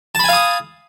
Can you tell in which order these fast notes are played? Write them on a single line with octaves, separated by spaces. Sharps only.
A5 B5 G#5 F5 D#6